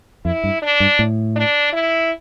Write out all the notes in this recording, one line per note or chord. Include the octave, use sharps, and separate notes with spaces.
F2 E4
G2
D4
G2
A2
D4
E4